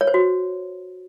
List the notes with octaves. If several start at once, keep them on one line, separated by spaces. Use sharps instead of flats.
C#5
C5
F#4